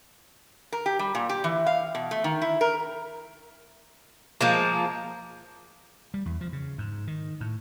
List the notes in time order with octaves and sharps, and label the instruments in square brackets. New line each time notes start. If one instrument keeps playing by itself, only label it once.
[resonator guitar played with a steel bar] A#4
G4
G3
A#2
G4
E3
F5
B2
A3
D#3
E4
A#4
[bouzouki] F3 G#3 A#3
[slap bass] G3
E2
F3
C#3
G#2
D#3
A2